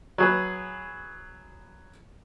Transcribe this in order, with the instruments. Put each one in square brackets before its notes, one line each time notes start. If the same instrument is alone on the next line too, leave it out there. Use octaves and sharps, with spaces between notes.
[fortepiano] F#3 G#4 B4